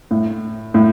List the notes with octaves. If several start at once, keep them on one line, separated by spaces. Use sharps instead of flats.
A2
A2